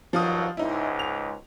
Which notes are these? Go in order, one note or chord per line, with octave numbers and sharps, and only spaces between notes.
G2 D#3 F3 F#3 F5 D#6
C#2 G#2 D#4 E4
F7